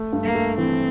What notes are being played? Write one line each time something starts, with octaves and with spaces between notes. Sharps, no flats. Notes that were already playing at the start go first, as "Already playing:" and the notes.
Already playing: A3
G2
A#3
A3
E3 C4